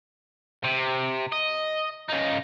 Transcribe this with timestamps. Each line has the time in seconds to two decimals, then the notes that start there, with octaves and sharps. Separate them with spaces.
0.64 C3
1.32 D#5
2.09 C#3 D#4